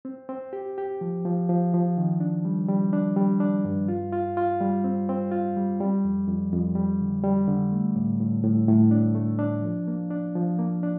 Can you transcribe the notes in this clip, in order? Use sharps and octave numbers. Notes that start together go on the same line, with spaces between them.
C4
C4
G4
G4
F3
F3
F3
F3
D#3
D4
G3
G3
D4
G3
D4
G2
F4
F4
F4
G3
C4
C4
F4
G3
G3
F2
F2
F2
G3
D3
G3
D3
A3
A2
A2
A2
A2
D4
A3
D4
F3
A#3
D4
F3
A#3
D4